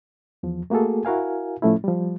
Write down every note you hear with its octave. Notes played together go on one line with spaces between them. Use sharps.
E2 F3
A3 A#3 F#4 G#4 A4
E4 F#4 A#4 F5 G#5
A2 F3 A3 C#4 E4
F3 G3